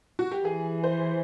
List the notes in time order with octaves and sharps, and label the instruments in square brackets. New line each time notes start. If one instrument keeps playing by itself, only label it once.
[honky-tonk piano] F#4
G4
[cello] E3 [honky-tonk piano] G#4
[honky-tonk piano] C5